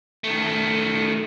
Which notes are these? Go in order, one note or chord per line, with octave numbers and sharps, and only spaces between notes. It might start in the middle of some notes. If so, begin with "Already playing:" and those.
D#3 A3